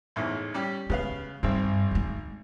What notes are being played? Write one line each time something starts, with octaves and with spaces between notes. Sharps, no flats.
A1 E2 G#2
G3 C#4 G4
C#3 G#3 B3 F5
G#1 G2 C4
D3 G#3